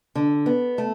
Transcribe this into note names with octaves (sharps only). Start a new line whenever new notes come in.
D3
B3
A3